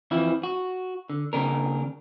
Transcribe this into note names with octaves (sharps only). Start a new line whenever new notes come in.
F2 E3 F3 E4
F#4
D3
D#2 C#3 D4 A#4